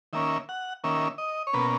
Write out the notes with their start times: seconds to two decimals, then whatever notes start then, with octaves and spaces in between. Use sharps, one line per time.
0.13 D#3 A#3 C#4 E5
0.49 F#5
0.84 D#3 A#3 C#4 E5
1.18 D#5
1.47 C#5
1.53 B2 A#3 C#4 B4